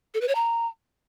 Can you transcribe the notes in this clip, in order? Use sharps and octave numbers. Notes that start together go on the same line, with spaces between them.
A4
B4
C#5
A#5